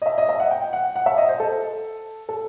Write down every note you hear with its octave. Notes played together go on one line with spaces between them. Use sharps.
D#5
E5
D#5
E5
F#5
G5
F#5
F#5
E5
D#5
C5
A4
A4